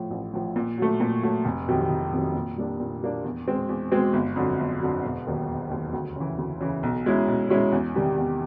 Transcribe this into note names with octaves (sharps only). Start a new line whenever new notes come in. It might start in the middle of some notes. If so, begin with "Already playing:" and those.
Already playing: A2 F3
A1
A2 F3
A#2
F#3 A3
A#2
F#3 A3
F1
F2 C3 D#3 F#3
F1
F2 C3 D#3 F#3
A#2
G3 A#3 D4
A#2
G3 A#3 D4
E2
B2 G#3 C4
E2
B2 G#3 C4
G1
F2 D3 F#3
G1
F2 D3 F#3
E1
D#2 D#3 F#3
E1
D#2 D#3 F#3
D2
C#3 E3
D2
C#3 E3
B1
B2 G#3 C#4 E4
B1
B2 G#3 C#4 E4
E2
C3 D#3 G3
E2